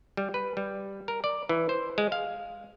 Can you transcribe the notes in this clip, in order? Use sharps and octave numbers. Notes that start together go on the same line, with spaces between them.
G3
B4
G3
A#4
D5
E3
C5
G#3
F5